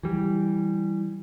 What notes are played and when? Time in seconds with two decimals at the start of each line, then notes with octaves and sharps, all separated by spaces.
0.03 E3 G3